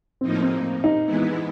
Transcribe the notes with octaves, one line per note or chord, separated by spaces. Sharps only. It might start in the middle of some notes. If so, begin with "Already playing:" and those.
A2 F3 A#3 C4 D#4
C4
D#4
E3 G#3 B3 E4